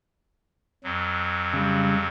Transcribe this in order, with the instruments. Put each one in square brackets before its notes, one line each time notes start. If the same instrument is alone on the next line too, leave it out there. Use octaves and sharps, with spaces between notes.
[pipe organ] F2 F#3
[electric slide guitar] C#3 G3